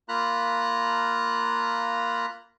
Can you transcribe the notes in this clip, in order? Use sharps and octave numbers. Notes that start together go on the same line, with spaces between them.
A#3 F4 A#5 B5 F#6